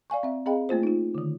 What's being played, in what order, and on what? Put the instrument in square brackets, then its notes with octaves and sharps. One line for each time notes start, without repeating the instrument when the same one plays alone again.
[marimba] D5 F5 G#5 C#6
C4 E5
C4 G#4 D#5 F5 G5 B5
A3 A#3 F4 C5
D#4 F4
D3 D#3